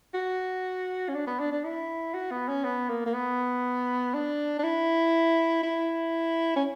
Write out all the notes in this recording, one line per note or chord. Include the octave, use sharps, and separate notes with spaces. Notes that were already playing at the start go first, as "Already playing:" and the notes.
F#4
C#4
D4
B3
D4
D4
E4
F#4
B3
C#4
B3
A#3
A#3
B3
D4
D4
E4
E4
C#4